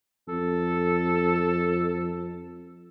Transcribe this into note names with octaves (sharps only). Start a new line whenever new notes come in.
F2 A4